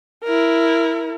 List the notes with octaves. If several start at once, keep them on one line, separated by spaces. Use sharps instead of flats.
E4 A#4